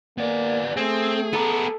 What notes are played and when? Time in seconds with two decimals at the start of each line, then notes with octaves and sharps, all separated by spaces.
0.18 A#3 B3 D5
0.77 A3 C4 G#4
1.33 B3 A4 A#4